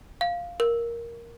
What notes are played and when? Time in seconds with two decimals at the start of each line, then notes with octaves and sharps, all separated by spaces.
0.21 F5
0.60 A#4